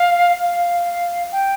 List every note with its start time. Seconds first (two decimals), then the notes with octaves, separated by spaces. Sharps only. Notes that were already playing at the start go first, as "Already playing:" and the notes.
Already playing: F5
0.42 F5
1.32 G5